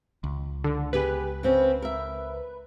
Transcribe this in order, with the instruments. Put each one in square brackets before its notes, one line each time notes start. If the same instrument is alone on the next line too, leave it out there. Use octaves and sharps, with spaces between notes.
[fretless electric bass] C#2
[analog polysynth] D3
[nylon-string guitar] B3 G4 G#4 [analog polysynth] B4
[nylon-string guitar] C#3 C4 C#4
A#4 E5